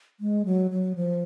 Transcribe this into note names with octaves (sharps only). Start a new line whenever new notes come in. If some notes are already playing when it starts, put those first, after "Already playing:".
G#3
F#3
F#3
F3